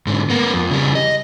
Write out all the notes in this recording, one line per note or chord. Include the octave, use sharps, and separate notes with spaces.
G#2 D3
A#3 B3
F2
C#3 G3
D#5